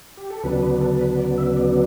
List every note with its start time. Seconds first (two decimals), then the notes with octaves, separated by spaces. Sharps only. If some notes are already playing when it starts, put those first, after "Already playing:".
0.17 G4
0.30 A4
0.43 D2 C#3 F#3 B3 D4 B4
0.63 B4
0.81 A4
0.99 B4
1.19 D5
1.38 E5
1.56 D5